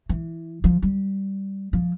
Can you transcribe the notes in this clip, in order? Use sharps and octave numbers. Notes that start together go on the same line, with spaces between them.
E3
F3
G3
F3